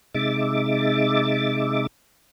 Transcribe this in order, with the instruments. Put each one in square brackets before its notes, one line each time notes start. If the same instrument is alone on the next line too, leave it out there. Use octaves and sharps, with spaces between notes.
[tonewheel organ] C3 G#3 D#4 E5 D6 A6